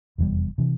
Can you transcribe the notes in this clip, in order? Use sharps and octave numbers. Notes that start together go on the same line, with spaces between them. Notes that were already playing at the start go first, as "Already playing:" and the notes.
F1 E2 B2 G3
C3 E3